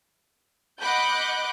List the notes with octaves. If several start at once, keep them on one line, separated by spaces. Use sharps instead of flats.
D#5 F#5 B5 D6 F#6 G6